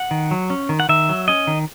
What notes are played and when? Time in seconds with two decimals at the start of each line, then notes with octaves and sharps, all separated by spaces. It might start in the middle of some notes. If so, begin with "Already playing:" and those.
Already playing: F#5
0.11 D#3
0.31 F#3
0.50 C#4
0.69 D#3
0.80 F#5
0.89 D#3 E5
1.09 F#3
1.28 C#4 D#5
1.47 D#3